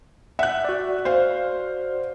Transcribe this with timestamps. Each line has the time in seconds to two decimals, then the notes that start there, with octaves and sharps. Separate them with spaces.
0.39 E5 F#5 F#6
0.64 F#4 D5
1.05 C5 F5